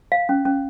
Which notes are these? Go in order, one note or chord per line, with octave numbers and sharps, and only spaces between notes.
F5
C#4
C#4